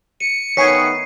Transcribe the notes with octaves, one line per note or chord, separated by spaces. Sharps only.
C#7 D#7
D#3 A3 B3 C#5 G#5 B6 C7 D#7